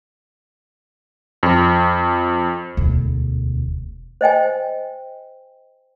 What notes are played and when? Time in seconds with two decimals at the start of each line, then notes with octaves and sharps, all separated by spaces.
1.43 F2
2.77 E1 D2
4.21 C5 D#5 G5 G#5